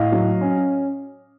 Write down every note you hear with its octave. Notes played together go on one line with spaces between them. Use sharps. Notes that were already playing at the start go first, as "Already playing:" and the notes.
Already playing: A2 D#5 F5
F#3
C#4